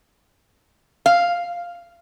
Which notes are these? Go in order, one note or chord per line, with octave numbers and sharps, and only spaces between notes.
F5